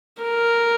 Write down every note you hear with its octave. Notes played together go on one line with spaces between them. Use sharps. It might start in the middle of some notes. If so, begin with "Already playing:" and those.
A#4